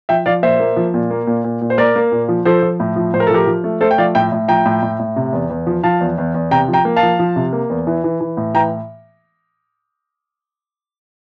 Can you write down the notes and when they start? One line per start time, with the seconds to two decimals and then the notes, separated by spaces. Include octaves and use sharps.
0.09 F3 E5 G5
0.26 F3 D5 F5
0.43 A#2 C5 E5
0.60 A#3
0.77 F3
0.94 A#2
1.11 A#3
1.27 A#2
1.44 A#2
1.61 A#2
1.70 C5
1.78 A#3 A#4 D5
1.96 A#3
2.12 A#2
2.29 F3
2.45 F3 A4 C5
2.62 F3
2.80 A2
2.96 F3
3.13 A2 C5
3.20 A#4
3.27 A4
3.31 F3 G4 A#4
3.47 F3
3.64 A3
3.81 A3 A4 C5
3.91 G5
3.98 F3 D5 F5
4.15 A2 E5 G5
4.32 A2
4.48 F3 G5 A#5
4.65 A2
4.82 A2
4.99 A2
5.16 C3
5.33 E2
5.50 E2
5.67 F3
5.83 F3 F5 A5
6.00 E2
6.18 E2
6.34 E2
6.51 C3 G5 A#5
6.68 F3
6.73 G5 A#5
6.85 A#3
6.96 F5 A5
7.03 F3
7.19 F3
7.36 C3
7.53 A#3
7.70 E2
7.87 E3
8.04 E3
8.21 E3
8.37 A2
8.54 E3 G5 A#5